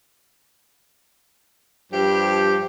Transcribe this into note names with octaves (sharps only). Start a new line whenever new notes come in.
G2 F3 G3 G4